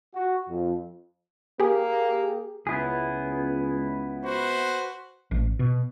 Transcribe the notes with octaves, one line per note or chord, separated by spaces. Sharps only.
F#4
F2
A#3 G4 G#4
C#2 B3 E4 G#4
F#4 B4 C5
A1
B2